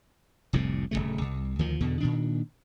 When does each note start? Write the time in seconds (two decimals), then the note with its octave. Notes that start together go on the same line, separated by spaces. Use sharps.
0.53 F1 C2 A2 C3
0.91 D1 C#2 C#3 A3
1.21 C2
1.59 D2 D#3 F3
1.81 E2 B2 D3
2.00 A#2 D#3 D4